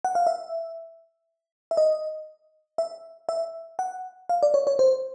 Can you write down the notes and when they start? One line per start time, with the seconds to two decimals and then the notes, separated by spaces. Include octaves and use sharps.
0.05 F#5
0.15 F5
0.27 E5
1.71 E5
1.77 D#5
2.78 E5
3.29 E5
3.79 F#5
4.29 F5
4.43 D5
4.54 C#5
4.67 C#5
4.79 C5